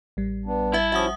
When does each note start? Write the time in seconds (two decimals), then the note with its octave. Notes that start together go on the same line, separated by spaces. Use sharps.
0.17 A1 G3
0.46 B3 D4
0.74 E4 E5 A5
0.92 F3 C#4 F#4 E5 F#5 D#6